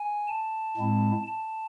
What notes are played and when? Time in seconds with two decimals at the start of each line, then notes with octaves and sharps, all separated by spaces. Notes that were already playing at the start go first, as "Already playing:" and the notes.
Already playing: G#5
0.28 A5
0.77 A2 G#3 C4 E4
1.27 A5